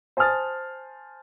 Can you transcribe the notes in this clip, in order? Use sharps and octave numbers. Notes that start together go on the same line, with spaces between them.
C5 G#5 A5 D#6 F6 A6